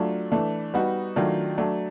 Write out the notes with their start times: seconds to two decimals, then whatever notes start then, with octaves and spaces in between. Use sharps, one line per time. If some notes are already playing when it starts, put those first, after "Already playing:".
Already playing: F#3 A3 D4 F4
0.32 E3 A3 D4
0.74 G3 B3 D#4 F#4
1.16 D#3 F#3 A3 D4 F4
1.58 F#3 A3 D4